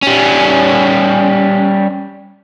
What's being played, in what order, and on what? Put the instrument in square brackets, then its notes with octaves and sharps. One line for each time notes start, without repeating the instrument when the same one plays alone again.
[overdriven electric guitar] G3 C#4